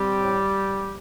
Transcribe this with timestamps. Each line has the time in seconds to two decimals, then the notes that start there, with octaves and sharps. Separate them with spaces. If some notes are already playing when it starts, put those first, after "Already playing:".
Already playing: G3 C4 G4
0.17 A2